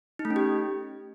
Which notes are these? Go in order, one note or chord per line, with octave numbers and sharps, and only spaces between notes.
D#4
A3
C#4
G4